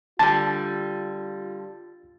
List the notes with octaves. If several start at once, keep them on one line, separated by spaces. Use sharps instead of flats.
D3 G3 F4 A5 A6